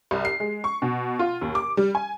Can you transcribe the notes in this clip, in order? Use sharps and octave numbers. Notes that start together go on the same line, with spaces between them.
C2
C7
G#3
C#6
B2
F4
D#2
D6
G3
G#5